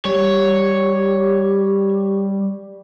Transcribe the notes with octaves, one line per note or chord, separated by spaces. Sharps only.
G3 G4 C#5